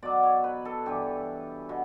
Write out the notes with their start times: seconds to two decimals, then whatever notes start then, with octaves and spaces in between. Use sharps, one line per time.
0.03 B2 F#3 D5
0.23 C#5
0.44 B4
0.65 A4
0.86 G2 E3 G4
1.69 B2